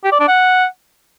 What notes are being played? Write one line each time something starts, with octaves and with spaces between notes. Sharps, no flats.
G4
D5
D4
F#5